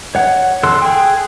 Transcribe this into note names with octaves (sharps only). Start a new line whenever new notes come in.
C#5 F#5
A4 C6 E6 F#6
G#4 G5